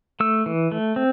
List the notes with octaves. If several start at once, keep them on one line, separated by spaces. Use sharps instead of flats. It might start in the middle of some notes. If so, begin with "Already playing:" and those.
A3 E6
E3
A3
C4